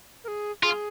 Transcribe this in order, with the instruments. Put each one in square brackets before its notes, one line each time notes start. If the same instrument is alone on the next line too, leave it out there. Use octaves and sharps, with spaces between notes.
[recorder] A#4
G#4
[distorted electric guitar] F4 [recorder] G#4